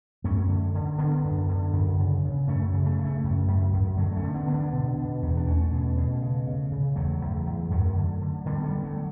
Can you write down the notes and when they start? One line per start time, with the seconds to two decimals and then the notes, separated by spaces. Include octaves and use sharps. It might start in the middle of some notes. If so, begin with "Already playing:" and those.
0.24 F#2 A3 C#4
0.48 D3
0.74 D3
0.98 D3 B3 D4
1.24 F#2
1.48 D3
1.73 F#2
1.99 C#3
2.24 C#3
2.48 F#2 A3 C#4
2.73 C#3
2.86 A3 C#4
2.98 C#3
3.05 A3 C#4
3.24 F#2
3.48 F#2
3.73 F#2
3.97 D3 F#3 A3
4.13 B3
4.16 A3 C#4
4.23 D3
4.34 B3 D4
4.48 D3
4.53 B3 D4
4.73 B2
4.98 B2
5.22 E2
5.37 D4
5.46 E2 A3 C#4
5.72 B2
5.97 B2
6.22 C#3
6.47 C#3
6.71 C#3
6.96 E2 F#3 A3
7.22 E2
7.46 E2
7.71 F#2 F#3 A3
7.96 D3
8.21 D3
8.46 D3 G3 B3
8.64 G3 B3
8.70 D3
8.83 F#3 A3